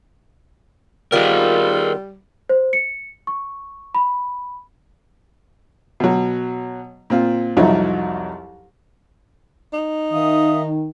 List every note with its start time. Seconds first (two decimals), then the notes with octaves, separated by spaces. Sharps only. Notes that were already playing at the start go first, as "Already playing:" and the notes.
1.12 D#3 G3 B3 F4 G#4 A#4
2.49 C5
2.73 C#7
3.27 C#6
3.95 B5
6.00 B2 F#3
7.10 A#2 C4 F4
7.57 C2 F2 F#3 D#4 E4
9.73 D#4
10.12 D#3 E5 F5 D#6